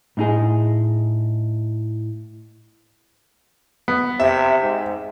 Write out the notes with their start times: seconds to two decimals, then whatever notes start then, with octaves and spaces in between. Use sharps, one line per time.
0.17 A2 D#4 G#4
3.88 B3
4.20 C3 E5
4.63 G#2